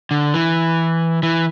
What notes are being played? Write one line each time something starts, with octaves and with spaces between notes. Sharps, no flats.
D3
E3
E3